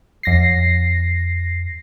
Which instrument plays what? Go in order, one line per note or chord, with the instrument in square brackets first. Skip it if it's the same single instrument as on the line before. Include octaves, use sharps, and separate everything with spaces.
[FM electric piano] F2 A#6 C7